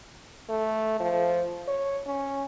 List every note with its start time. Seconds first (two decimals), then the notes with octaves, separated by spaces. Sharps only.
0.49 A3
1.00 F3
1.68 C#5
2.06 C#4